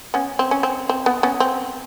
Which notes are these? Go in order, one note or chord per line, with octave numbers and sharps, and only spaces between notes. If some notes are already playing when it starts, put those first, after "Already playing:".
B3 C#4
C4
C#4
C4
C4
B3
B3 C#4
C4